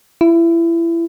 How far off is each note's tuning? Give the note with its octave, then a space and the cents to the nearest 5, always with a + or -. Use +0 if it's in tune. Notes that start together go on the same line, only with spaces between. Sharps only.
E4 +25